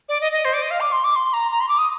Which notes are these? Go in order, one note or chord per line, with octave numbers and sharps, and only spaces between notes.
D5
D#5
D#5
C5
D5
D#5
F5
D6
C6
D6
C6
A#5
A#5
C6
D6
D#6